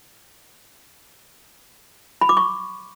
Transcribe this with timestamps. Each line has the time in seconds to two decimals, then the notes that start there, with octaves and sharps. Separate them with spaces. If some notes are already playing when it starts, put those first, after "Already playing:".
2.21 B5
2.29 D6
2.37 C#6